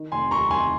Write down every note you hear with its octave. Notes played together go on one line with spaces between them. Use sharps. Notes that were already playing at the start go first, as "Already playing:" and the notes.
Already playing: D#3
F1 G#5 C6
D#2 A#5 C#6
D#3 G#5 C6